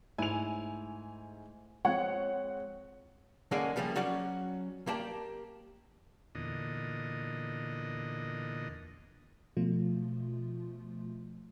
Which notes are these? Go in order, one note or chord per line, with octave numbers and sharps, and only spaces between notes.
G#2 A3 E4 G#5 F7
F3 G#3 C4 C#5 F#5
D3 G#3 A#3 C#4 G#4 D5
C#3 F3 G3 A3 A#3
F#3 C#4 F#4 D5
A#3 G4 D5 A5
E2 A#2 D3 D#5
B2 F3 A3 F4